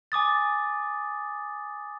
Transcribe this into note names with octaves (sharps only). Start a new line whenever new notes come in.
G#5 D6 D#6 A6